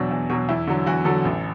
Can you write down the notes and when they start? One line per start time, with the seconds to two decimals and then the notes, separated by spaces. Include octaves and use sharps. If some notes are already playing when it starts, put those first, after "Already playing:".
Already playing: E2 B2 F#3 D4
0.11 E2
0.30 B2 F#3
0.49 E2 E4
0.67 D3 F#3
0.86 E2 F#4
1.05 D3 F#3 A4
1.25 A1